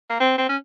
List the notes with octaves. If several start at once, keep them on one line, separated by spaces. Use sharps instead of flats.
A#3
C4
C4
C#4